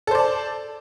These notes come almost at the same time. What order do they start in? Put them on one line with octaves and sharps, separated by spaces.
A4 C5 D5 A5